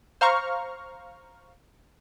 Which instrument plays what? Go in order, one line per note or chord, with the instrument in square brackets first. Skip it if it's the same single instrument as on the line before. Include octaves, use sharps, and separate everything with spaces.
[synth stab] C5 F5 A#5 C#6 F6